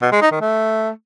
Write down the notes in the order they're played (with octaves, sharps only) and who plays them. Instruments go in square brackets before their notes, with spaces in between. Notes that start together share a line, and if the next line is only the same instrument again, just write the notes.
[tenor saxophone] B2
G#3
D#4
D#3
A3